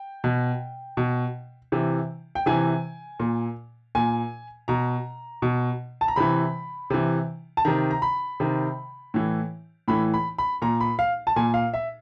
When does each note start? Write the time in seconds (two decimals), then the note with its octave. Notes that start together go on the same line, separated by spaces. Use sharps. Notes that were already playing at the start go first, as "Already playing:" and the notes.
Already playing: G5
0.24 B2
0.97 B2
1.72 C3 E3
2.35 G5
2.46 C3 E3 G#5
3.20 A#2
3.95 A#2 G#5
4.68 B2 A#5
5.42 B2
6.01 A5
6.08 A#5
6.16 C3 E3 B5
6.90 C3 E3
7.57 A5
7.65 C3 D#3 A#5
7.91 A#5
8.02 B5
8.40 C3 D#3
9.14 A2 E3
9.88 A2 E3 B5
10.14 B5
10.38 B5
10.62 A#2 A#5
10.80 B5
10.99 F5
11.27 A5
11.36 A#2 G#5
11.54 F5
11.74 E5